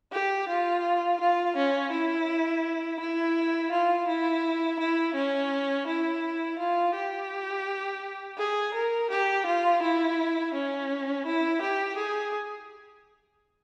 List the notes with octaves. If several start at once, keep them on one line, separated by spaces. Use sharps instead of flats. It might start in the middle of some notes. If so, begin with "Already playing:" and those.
G4
F4
F4
C#4
E4
E4
F4
E4
E4
C#4
E4
F4
G4
G#4
A#4
G4
F4
E4
C#4
E4
G4
G#4